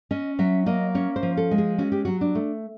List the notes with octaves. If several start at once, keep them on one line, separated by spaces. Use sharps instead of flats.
C#4 D#5
F#3 E5
A#3 D#5
C#4 C#5
C5
F3
A4
G#3
G#4
C#4 F#4
G4
F#3 F#4
D4
A3